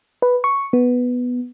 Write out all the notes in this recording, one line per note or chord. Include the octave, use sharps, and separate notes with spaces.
B4
C#6
B3